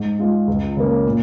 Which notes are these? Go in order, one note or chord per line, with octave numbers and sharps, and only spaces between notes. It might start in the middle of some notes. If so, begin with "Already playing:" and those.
Already playing: G#2
G#3 F4
C#2
C#3 A#3
A#2